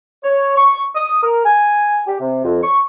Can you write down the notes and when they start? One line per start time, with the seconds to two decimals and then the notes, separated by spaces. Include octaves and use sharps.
0.23 C#5
0.57 C#6
0.95 D#6
1.23 A#4
1.45 G#5
2.07 G4
2.20 C3
2.45 F2
2.62 C#6